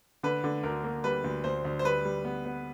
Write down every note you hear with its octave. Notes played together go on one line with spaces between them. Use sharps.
D3 B4
D3
D2 A#4
A#3
G3 B4
D2
D2 C5
D2
C5
G3 B4
G3
B3
B3